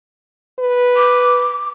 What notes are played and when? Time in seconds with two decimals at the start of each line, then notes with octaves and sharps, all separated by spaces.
0.59 B4
0.97 D6